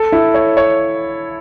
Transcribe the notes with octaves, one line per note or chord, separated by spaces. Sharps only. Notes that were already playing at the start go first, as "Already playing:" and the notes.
Already playing: A4
E4
C#5
C#5